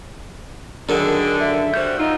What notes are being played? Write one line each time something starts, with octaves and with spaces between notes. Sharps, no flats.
F#2 D3 D#3 D4 G#4 A4
E5
G3 F#4 C5 G6
F#3 D#4 F4 E6